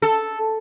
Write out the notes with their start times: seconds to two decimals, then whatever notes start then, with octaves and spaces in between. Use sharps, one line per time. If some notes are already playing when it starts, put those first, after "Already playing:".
0.02 A4